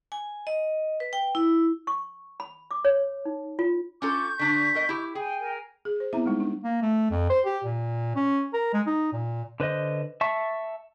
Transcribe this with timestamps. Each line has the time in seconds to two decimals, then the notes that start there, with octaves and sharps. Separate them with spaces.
0.12 G#5
0.47 D#5
1.00 B4
1.13 G5
1.35 E4
1.87 C#6
2.40 B5
2.71 D6
2.85 C#5
3.25 D#4
3.59 F4
4.02 C#4 F4 A4 C#6 D6 G6
4.39 D3 D4 B6
4.74 B2 A#4 D#5
4.89 E4 G4
5.15 G#4 G5 G#5
5.39 A#4 G#5
5.85 G#4
6.00 C5
6.13 B3 C4 E4 E5 A#5
6.26 G3 G#3 D#4
6.40 D4
6.64 A#3
6.82 A3
7.11 F2
7.30 C5
7.45 G4
7.64 A#2
8.16 C#4
8.53 A#4
8.73 G#3
8.86 D#4
9.13 A#2
9.60 D3 B4 C5 D#5
10.21 E5 A5 C#6